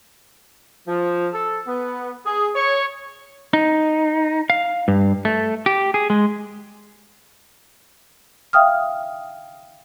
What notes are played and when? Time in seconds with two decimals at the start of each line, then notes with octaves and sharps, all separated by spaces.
0.88 F3
1.33 A4
1.67 B3
2.26 G#4
2.55 C#5
3.53 D#4
4.50 F5
4.88 G2
5.25 A3
5.66 G4
5.94 G#4
6.10 G#3
8.53 E5 F5 G5 D#6 F6